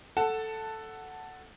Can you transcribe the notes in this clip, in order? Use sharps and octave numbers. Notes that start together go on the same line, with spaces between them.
A4 F#5 A5